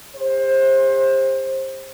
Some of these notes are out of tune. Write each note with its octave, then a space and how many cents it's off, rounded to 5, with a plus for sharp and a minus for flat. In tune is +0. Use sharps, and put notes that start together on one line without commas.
G4 +40 C5 +25